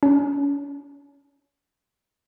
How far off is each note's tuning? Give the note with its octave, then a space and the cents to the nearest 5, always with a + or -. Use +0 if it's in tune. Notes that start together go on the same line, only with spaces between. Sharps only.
C#4 +40